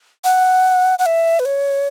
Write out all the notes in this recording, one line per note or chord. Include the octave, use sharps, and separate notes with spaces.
F#5
F#5
E5
B4
C#5